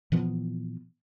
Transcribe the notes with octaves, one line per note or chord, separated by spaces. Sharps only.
A#2 E3 F3 B3